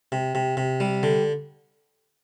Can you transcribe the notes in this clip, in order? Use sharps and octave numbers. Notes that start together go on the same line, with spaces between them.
C3
C3
C3
G3
D3